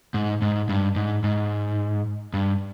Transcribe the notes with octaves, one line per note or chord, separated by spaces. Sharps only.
G#2
G#2
G2
G#2
G#2
G2